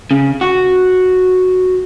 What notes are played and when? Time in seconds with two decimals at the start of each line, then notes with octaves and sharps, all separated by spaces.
0.11 C#3
0.41 F#4